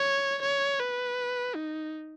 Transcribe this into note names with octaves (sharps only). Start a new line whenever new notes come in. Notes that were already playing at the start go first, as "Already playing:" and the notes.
Already playing: C#5
C#5
B4
D#4